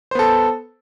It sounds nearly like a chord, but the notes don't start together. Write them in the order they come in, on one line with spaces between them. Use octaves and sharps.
C5 B3 A4